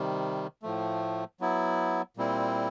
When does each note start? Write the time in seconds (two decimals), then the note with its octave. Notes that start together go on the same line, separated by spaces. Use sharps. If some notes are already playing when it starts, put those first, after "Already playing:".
Already playing: C3 D#3 G3
0.62 A2 F3 A3
1.40 F#3 B3 E4
2.17 A#2 G3 C4 E4